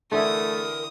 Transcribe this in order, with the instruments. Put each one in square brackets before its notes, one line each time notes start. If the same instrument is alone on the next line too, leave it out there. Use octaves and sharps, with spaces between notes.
[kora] D3 E3 E4 [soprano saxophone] A3 [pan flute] A#4 [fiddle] D#6